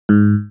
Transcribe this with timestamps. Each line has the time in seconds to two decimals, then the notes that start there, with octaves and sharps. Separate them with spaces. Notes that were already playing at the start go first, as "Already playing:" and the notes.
0.09 G#2